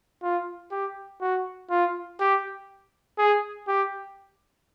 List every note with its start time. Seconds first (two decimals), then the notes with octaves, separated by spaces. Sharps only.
0.23 F4
0.71 G4
1.21 F#4
1.70 F4
2.20 G4
3.18 G#4
3.68 G4